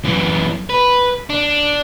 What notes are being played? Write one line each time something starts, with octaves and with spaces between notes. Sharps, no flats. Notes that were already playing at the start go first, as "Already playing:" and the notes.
F#2 E3
B4
D4